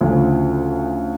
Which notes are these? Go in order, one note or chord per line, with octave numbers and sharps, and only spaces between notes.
D2 C#3 F3